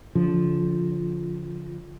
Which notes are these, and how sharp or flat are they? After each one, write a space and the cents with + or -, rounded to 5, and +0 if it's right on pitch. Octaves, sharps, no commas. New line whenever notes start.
D3 -40 F3 +0